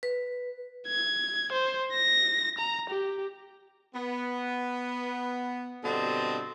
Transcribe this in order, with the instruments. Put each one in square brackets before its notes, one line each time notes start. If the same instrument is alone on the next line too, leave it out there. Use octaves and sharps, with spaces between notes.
[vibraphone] B4
[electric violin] G#6
C5
A#6
A#5
G4
[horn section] B3
G2 B2 D3 C4 D#5 A5